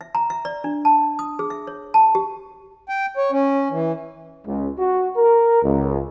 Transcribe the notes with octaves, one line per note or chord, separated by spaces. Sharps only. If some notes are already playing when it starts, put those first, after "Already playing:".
E5
A#5
E5
D5
D4
A5
D#6
G#4
E5
C#5
A5
G4
G5
C#5
C#4
E3
C#2
F#4
A#4
C#2